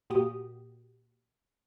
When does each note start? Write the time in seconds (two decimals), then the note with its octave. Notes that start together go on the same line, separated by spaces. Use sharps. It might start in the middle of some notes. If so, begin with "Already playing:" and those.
0.10 A#2 F#4 G4 D#6